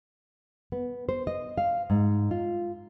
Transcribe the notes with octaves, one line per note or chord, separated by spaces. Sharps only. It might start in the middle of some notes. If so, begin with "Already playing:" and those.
B3
C5
D#5
F5
G#2
F4